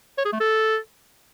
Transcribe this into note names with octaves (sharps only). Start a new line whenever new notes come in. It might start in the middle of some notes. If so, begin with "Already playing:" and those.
C#5
G#4
A3
A4